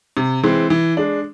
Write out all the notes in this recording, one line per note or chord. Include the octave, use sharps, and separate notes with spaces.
C3
E3 G#3 C4
E3
G#3 D4